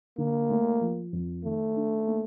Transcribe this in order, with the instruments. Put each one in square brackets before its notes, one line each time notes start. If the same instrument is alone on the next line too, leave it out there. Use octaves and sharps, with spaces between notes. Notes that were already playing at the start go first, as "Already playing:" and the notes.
[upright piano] D3 [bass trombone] A#3
[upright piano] A3
F3
F2
[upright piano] D#3 [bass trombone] A3
[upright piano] D4
A#3